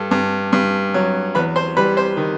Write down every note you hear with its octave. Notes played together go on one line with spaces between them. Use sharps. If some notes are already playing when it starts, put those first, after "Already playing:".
Already playing: G2 A4
G2
G2
F#3
E2 B4 B5
C5 C6
G3 B4 B5
C5 C6
D#3